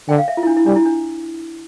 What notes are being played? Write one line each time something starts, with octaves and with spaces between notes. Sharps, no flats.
D3 G5
F5
E5
F4
E4
D4
E4
G3 D4
E4
D4